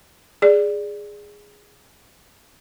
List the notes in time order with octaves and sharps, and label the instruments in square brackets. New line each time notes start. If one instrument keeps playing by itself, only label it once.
[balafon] G#4 D5